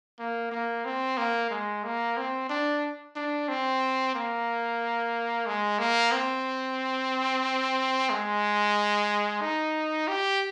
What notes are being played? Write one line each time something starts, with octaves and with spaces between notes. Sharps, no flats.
A#3
A#3
C4
A#3
G#3
A#3
C4
D4
D4
C4
A#3
G#3
A#3
C4
G#3
D#4
G4